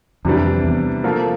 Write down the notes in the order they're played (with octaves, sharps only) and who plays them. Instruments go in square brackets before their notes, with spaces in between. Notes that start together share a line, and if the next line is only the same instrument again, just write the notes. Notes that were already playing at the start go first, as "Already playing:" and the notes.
[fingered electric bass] F2 [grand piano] C3 E3 G3 D4
[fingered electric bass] E2
[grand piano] F3 A#3 F4 A4